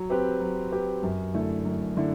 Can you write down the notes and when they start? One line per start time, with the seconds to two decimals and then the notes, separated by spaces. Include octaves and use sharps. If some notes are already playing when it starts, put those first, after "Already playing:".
Already playing: F#3
0.10 C4 G4 B4
0.40 F#3
0.72 C4 G4 B4
1.03 F#2
1.34 D3 A3 E4
1.65 F#2
1.96 D3 A3 E4